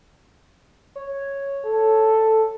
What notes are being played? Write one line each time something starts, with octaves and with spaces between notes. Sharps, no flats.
C#5
A4